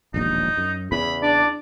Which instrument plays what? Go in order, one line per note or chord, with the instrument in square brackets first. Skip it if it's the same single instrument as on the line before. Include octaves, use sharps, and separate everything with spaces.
[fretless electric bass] E1 A#1 D#2 [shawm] D#4
[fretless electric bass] F#2
[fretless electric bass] E2 C#3 [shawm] B5
[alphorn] D4 [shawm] D5